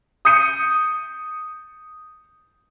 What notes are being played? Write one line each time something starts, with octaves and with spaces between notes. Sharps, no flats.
D#6 G6 C#7 D#7